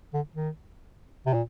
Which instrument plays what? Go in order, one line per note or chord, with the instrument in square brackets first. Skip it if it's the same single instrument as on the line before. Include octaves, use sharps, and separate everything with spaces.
[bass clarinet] D3
D#3
C3
A#2